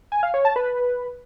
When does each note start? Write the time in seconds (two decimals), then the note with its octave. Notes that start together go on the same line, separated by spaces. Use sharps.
0.12 G#5
0.23 F5
0.34 C#5
0.45 A5
0.56 B4